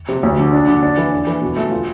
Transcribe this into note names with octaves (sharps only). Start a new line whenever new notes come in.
C3
D2
D3
D4
D3
D4
E3
D4
E3
B2
A3
F4